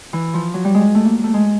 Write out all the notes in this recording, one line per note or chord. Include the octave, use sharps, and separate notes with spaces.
E3
F3
F#3
G3
G#3
A3
A#3
A3
G#3